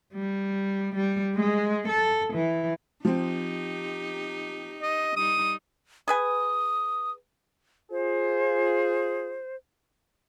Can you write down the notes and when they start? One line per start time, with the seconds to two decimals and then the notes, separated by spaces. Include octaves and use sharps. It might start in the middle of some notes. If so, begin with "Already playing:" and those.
0.15 G3
0.95 G3
1.36 G#3
1.88 A4
2.34 E3
3.05 F3 C4 D#4 G4
4.82 D#5
5.16 G3 D#4 D#6
6.08 G#4 B4 G#5 D#6
7.91 F4 G#4 C5